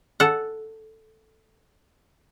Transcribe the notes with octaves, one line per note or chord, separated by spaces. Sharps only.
A4 F#5